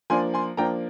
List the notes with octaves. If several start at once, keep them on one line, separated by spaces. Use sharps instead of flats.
F3 A#3 D4 G#5 C6
G#5 C6
F3 A#3 D4 G5 A#5